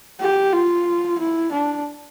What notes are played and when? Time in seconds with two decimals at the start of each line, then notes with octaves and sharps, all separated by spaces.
0.21 G4
0.53 F4
1.19 E4
1.52 D4